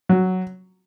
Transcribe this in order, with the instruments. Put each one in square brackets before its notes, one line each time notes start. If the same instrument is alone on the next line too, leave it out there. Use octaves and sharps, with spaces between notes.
[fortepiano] F#3